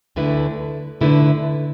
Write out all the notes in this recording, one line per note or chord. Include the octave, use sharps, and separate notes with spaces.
D2 D3 A3 E4 B4
D2 D3 A3 E4 B4